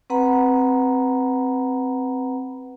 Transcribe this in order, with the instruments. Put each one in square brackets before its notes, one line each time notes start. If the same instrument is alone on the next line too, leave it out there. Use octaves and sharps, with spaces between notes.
[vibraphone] C4 B4 F#5 A#5 B5